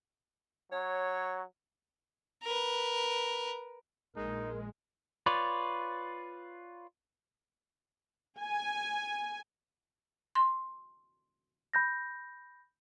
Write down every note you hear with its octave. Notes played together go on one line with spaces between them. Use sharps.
F#3 C#5
A#4 B4
A#1 G#3 D#4 A#4
F4 B4 C#5 D5
G#5
C6
B5 G6 A#6